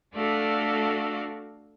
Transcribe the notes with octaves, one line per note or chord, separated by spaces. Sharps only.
A3 D4 F#4 A4 D5 F5